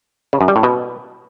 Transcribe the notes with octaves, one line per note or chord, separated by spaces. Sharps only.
C#3
F#2
G3
A2
B2